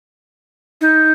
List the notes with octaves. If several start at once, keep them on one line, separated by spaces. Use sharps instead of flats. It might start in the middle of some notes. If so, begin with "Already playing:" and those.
D#4